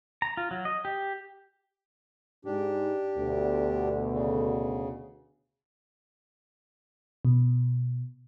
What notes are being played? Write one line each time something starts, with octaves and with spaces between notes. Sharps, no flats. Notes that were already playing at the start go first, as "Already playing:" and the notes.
A#5
F4
F#3
D#5
G4
G#2 D4 G4
D2 B2 D3
C#3
B2